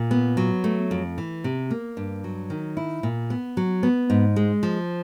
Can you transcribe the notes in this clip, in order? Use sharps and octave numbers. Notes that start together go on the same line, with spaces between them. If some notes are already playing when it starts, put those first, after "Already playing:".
Already playing: A#2
B3
F#3
A3
F2
E3
C3
A#3
G2
F#3
D#3
E4
A#2
B3
F#3
B3
G#2
G#3
F3